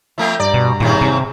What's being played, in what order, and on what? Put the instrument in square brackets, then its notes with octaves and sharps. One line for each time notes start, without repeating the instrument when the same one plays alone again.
[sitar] F3 A3 C4 [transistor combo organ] E5
[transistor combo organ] G2 A#5 [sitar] D5
[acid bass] B2
[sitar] D#2 C#3 C4 [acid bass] A#2
[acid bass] C3